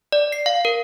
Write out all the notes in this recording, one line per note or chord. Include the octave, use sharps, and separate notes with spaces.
D5
C7
F5
A#4